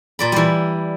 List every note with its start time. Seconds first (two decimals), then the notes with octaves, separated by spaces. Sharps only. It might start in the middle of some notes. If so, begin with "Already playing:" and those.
0.19 A#2 D5 B5
0.32 E3 G3